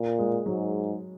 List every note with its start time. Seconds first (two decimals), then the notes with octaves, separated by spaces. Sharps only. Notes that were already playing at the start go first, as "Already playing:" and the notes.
Already playing: A#2
0.19 G#3
0.46 G#2 F#3